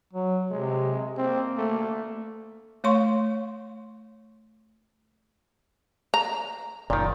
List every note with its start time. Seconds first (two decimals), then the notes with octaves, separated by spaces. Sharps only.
0.13 F#3
0.51 C3 G#3
1.17 A#3 C4
1.58 A3
2.84 A3 C#5 F5 C6 C#6
6.14 A#5
6.90 F#1 A#2 D#3 D5